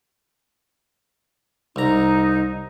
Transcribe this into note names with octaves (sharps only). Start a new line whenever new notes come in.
C2 D#4 A#5